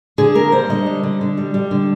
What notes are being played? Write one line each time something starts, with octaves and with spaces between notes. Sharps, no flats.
D3 G#4
A#3 A#4
G3 C5
D3 D#5
G3
D3
D3
G3
G3
D3